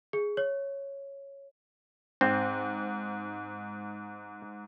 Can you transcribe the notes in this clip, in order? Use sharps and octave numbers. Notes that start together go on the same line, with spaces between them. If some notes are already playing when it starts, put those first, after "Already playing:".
G#4
C#5
G#2 C4